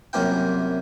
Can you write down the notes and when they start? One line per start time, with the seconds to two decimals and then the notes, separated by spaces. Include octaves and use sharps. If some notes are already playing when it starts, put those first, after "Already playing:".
0.13 C2 F#2 A#3 F4 G5